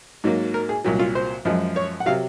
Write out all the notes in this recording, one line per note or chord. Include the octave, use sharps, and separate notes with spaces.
G#2 F#3 A#3
A#4
G#4
C2 A#2 F#3
F4
C5
F#2 F3 G#3
C#5
F#5
C3 F#3 F5